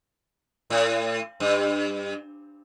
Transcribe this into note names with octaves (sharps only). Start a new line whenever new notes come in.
A2
G2